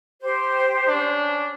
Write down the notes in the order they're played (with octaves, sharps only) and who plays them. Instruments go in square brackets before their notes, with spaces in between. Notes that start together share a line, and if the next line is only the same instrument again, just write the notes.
[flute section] G4 C5
[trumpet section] C#4 D4